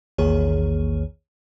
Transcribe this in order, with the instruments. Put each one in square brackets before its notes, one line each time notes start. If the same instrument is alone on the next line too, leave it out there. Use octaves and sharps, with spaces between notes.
[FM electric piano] A#1 E2 D#3 A#3 G#4 C#5